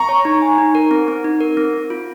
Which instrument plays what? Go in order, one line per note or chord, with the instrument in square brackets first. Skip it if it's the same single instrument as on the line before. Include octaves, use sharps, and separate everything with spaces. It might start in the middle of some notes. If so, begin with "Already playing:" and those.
Already playing: [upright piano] A#5 C#6
[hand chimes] C#5
D#4
G#5
D#4
A#4
C4
C4
D#4
A#4
C4
C4
F4